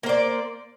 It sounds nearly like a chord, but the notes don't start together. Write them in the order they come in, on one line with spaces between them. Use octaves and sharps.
A#3 C5 D5